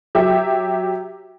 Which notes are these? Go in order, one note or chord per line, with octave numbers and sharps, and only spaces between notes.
F#3 G4 E5